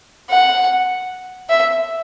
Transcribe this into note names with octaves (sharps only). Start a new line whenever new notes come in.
F#5
E5